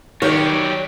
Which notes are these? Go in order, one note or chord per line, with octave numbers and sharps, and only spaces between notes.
D#3 F#3 G4 C#5 D5